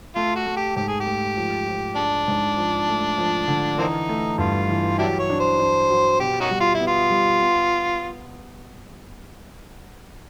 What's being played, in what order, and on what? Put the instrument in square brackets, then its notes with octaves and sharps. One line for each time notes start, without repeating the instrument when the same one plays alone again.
[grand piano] A3 [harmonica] F4
[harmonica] F#4
[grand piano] A3
[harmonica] G4
[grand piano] G#2 [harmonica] G4
[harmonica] G#4
G4
[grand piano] A3
F3
F3
[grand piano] G#3 [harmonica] D4
[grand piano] G#2
F3
A3
F3
D3
[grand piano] E3 [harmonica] A#3 C4 D#4
[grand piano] A3
[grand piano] G2 [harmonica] F4
[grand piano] E3
[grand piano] F#3 [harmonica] D4 E4 G4
[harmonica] C#5
[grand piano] D4
[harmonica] C5
[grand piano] D4
F#3
[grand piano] B2 [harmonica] G4
[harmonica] C#4 D#4 F#4
[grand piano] G3
[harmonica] F4
E4
[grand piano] B3
[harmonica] F4
[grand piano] G3
B3